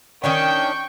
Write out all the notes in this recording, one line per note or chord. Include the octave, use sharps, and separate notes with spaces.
D#3 C#4 D4 G5 C#6